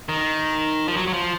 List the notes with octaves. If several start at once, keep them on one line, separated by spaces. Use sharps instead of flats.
D#3
F3
F#3
F#3
F3